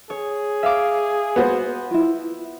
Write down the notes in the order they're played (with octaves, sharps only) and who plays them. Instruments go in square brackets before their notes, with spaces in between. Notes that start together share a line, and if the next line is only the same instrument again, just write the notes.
[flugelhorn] G#4 [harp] C#5
[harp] E5 F5 D6
[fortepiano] B3 F#4 C5
[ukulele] E4 F4